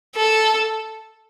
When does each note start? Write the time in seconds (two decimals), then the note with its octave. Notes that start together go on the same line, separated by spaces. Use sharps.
0.16 A4